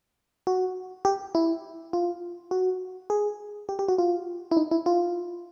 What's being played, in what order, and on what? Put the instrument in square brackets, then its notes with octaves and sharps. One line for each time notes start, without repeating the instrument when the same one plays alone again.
[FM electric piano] F#4
G4
E4
F4
F#4
G#4
G4
G4
F#4
F4
E4
D#4
E4
F4